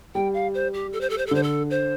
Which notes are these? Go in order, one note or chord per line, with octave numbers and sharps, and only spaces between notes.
G3 G5
F5
C5
G4
A4
C5
A4
C5
A4
D3 C5
A4
C5